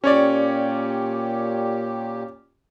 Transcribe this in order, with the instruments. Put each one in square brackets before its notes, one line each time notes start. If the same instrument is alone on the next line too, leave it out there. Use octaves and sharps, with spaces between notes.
[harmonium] A#2 G4 [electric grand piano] C#4 C#5 D5